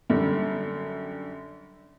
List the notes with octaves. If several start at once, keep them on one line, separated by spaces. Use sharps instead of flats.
F#2 D3 G3